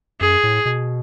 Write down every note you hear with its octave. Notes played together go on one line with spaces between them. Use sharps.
F#2 G#4
A2
B2